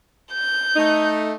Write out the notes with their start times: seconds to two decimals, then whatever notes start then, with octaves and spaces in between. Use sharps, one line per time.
0.32 G6
0.76 A3 D#4